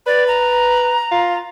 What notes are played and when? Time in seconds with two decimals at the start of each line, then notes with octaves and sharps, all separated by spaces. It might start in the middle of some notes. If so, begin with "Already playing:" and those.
0.07 B4 D5
0.28 A#5
1.11 F4